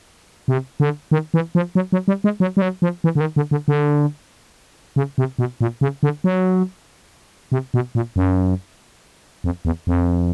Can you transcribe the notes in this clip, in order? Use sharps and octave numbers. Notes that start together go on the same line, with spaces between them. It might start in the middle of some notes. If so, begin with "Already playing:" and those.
C3
D3
D#3
E3
F3
F#3
F#3
G3
G#3
F#3
G3
F#3
F3
E3
D3
D#3
D3
D3
D3
C#3
C3
B2
A#2
C#3
D3
F#3
C3
B2
A#2
F#2
F2
E2
F2